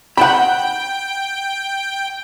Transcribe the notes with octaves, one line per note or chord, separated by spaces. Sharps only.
F#5 G5 A5 B5